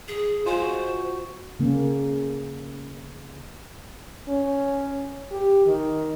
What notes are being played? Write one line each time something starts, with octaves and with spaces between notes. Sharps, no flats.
G#4
G#3 F4 C5
F#4
C#3 A#3 C#4
C#4
G4
D#3